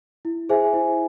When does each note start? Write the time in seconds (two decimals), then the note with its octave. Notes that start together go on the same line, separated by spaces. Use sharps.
0.25 E4
0.49 G#4 C5 E5 G#5
0.74 E4